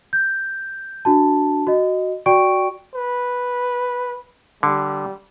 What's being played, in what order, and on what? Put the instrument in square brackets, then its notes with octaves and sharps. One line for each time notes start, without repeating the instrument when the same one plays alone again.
[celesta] G6
D4 F#4 A5
F#4 D#5
F#4 D5 G5 C#6 D7
[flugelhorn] B4
[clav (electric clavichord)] D3 [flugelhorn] G3